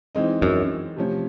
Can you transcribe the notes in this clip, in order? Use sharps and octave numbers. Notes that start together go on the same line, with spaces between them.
E3 G#3 C4 D#4
F#2
C3 F3 A3 C#4